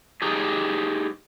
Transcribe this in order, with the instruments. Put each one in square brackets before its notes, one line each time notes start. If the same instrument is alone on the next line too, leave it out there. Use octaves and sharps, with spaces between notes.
[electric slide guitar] D#4 G4 G#4